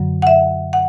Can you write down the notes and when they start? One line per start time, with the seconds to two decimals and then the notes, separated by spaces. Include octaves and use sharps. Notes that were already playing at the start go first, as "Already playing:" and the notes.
Already playing: F#2 D3 F#3
0.22 F#5
0.27 E5
0.73 F#5